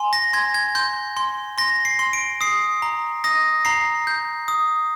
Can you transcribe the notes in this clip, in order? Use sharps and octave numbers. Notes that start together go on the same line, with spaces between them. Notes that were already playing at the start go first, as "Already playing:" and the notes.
Already playing: G#5 C6
A#6
C6 G#6
G#6
C6 G6
C6
C6 A#6
C7
C6
D7
D#6 C7
A#5
D#6 A#6
A#5 C7
G6
D#6